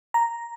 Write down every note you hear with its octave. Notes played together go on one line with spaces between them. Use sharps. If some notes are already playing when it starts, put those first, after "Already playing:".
A#5